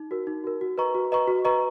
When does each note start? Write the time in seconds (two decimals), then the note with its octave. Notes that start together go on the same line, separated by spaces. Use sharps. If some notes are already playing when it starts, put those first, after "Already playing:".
Already playing: D#4
0.11 F#4 A#4
0.27 D#4
0.44 F#4 A#4
0.61 F#4
0.78 B4 D#5 A#5 C#6
0.95 F#4
1.12 B4 D#5 A#5 C#6
1.28 F#4
1.45 B4 D#5 A#5 C#6